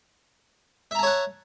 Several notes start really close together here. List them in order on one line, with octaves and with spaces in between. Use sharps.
E5 A#5 A5 C#5 F#5